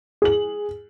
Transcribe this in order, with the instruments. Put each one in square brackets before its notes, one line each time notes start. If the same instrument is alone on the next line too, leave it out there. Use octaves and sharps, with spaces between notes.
[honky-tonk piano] G#4 F#7